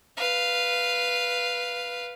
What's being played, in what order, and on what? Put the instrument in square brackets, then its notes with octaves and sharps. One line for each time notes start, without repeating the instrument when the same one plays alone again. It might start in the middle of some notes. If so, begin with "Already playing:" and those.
[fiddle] B4 F5